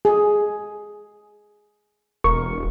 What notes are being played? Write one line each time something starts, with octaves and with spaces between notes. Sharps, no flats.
G#4
E1 A#4 C#6